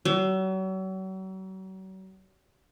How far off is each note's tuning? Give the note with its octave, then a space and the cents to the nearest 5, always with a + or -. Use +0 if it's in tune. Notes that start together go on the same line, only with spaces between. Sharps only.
F#3 +40